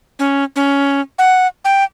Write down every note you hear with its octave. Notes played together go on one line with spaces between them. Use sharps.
C#4
C#4
F#5
G5